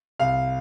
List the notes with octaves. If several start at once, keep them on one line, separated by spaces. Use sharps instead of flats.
C2 F5